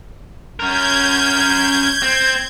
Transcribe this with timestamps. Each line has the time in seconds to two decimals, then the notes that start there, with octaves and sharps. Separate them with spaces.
0.60 C#4 A#4 G6 G#6
2.02 C4